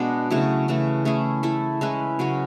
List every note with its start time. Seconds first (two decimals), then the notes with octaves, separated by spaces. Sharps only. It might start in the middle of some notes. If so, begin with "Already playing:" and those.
Already playing: B2 G#3 B3 D4
0.30 C#3 F#3 A3 E4
0.68 C#3 E3 A3
1.05 A3 C#4 E4 G#4
1.43 A3 E4 A4
1.81 G#3 C#4 E4 B4
2.19 C#3 F#3 C#4